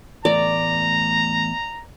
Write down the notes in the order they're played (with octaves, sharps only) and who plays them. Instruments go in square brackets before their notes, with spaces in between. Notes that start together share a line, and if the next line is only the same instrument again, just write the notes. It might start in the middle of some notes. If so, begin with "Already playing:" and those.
[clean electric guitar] E2 A2 A3 [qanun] D5 [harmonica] A#5